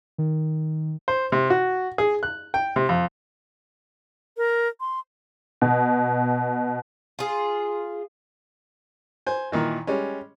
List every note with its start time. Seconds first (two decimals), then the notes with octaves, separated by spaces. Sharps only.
0.18 D#3
1.08 C5
1.32 C3
1.50 F#4
1.98 G#4
2.23 F#6
2.54 G5
2.76 C3
2.89 F2
4.37 A#4
4.80 C6
5.62 B2
7.19 F4 G#4
9.26 C5 G#5
9.52 A#2 D#3 E3
9.87 G3 G#3 C#4